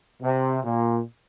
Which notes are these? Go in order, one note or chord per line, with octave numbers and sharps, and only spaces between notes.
C3
A#2